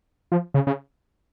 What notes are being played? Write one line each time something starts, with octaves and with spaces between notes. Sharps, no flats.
F3
C#3
C#3